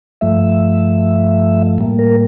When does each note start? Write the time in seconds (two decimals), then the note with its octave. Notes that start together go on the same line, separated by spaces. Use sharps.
0.21 G2 F3 A3 E5
1.78 A2 G3 A#3
1.99 A#4